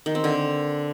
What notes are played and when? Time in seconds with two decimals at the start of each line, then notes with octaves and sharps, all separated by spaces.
0.06 D#3
0.15 C4
0.24 D3